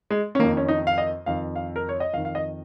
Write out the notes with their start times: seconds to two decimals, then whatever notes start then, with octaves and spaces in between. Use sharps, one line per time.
0.10 G#3
0.35 C#4
0.39 F2 D#3 A#3
0.57 C#4
0.68 D#4
0.87 F5
0.98 D#5
1.26 F2 D#3 F5
1.56 F5
1.76 A#4
1.89 C#5
2.00 D#5
2.13 F2 F5
2.17 D#3
2.25 F5
2.35 D#5